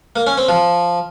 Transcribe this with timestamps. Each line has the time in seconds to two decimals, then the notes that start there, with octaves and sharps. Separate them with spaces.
0.16 A#3
0.27 C#4
0.38 C4
0.49 F3